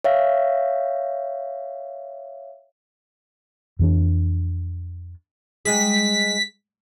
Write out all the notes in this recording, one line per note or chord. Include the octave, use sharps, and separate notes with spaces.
C#5 E5 F5
F2 E3 D4
G3 G#3 G#4 B6